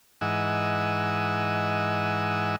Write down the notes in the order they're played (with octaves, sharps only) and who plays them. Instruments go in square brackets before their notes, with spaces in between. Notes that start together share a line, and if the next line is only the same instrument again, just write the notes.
[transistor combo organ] G#2 E3 D#5 F#5 G#5 E6